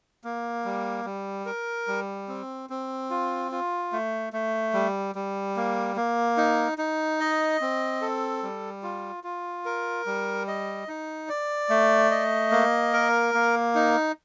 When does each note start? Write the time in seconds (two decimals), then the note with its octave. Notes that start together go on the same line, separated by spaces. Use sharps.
0.24 A#3
0.65 G3
1.05 G3
1.46 A#4
1.87 G3
2.28 C4
2.70 C4
3.10 F4
3.52 F4
3.92 A3
4.33 A3
4.73 G3
5.15 G3
5.56 A#3
5.96 A#3
6.37 D#4
6.78 D#4
7.20 D#5
7.61 C4
8.01 A4
8.43 G3
8.83 F4
9.24 F4
9.65 A#4
10.06 G3
10.48 D#5
10.88 D#4
11.29 D5
11.70 A3
12.11 D#5
12.52 A#3
12.93 A#4
13.34 A#3
13.75 D#4